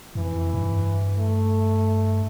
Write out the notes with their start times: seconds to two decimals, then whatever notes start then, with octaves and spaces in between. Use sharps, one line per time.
0.15 F2 E3
0.54 G2
1.17 A3